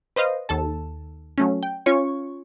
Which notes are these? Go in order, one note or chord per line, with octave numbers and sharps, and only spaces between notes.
B4 C5 D#5 F5
D#2 A4 A5
F#3 A3 C#4
G5
C#4 F4 C#5 C#6